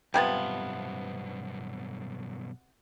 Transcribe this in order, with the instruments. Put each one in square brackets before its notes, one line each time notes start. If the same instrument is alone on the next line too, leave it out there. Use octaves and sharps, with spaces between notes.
[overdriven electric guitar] B1 G2 [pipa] C3 F3 B3 [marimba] G5 G#6 A6